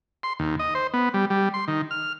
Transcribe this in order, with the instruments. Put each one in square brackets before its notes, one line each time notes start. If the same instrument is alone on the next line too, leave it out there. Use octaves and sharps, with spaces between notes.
[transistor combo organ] C6
D#2
D#5
C5
B3
G3
G3
C6
D#3
F6